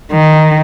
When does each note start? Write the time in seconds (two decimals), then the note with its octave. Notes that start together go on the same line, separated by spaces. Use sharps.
0.12 D#3